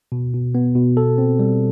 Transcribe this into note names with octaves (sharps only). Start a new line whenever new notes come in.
B2
B2
B3
B2
A4
C4
G3